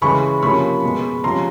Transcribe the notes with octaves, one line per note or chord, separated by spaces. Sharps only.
C#3 E3 G#3 B5 C#6
C3 F3 A#3 C#4 B5 C#6
B2 G#3 B3
C3 F3 G#3 C#4 A#5 C6